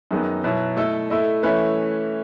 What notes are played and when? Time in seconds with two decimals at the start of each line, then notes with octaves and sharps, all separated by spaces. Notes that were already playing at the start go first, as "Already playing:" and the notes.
0.11 F#2 D#3 G#3 B3 D#4
0.44 B2 F#3 B3 E4
0.77 A3 E4 A4 D#5
1.10 A3 E4 A4 D#5
1.43 E3 A3 C#4 E4 B4